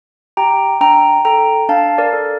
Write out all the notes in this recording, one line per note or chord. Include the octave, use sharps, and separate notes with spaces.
G4 G5 A#5
D4 G5 A#5
A4 G5 A#5
D4 F5 A5
A#4 D5
A4